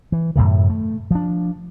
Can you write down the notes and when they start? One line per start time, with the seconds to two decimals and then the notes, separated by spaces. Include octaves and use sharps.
0.12 E3
0.36 F#2 A2 C3 D#3
0.70 A3
1.11 F3 D4